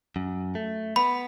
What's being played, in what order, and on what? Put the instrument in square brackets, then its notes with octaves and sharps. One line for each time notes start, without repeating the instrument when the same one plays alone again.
[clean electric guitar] F#2
A3
[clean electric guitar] B3 [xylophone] B5